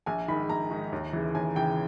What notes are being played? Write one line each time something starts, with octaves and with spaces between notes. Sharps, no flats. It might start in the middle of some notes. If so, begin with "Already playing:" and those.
A#1 G#5
G#2 D#3 B5
A#1 A#5
G#2 D#3
D#2
C#3 E3
D#2 G#5
C#3 E3 G5